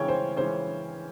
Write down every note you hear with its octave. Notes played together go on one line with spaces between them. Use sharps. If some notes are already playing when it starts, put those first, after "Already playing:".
Already playing: C#3 E3 G#3 C#4 C#5 G5
C5
C#3 E3 G#3 C#4 C5